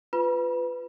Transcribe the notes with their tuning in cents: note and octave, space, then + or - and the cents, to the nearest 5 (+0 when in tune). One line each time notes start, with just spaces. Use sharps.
F4 +0 B4 +15 B5 -40